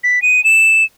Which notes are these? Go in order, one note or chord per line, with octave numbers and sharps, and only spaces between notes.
B6
D#7
E7